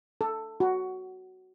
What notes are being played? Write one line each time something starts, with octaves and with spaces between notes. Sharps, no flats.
A4
F#4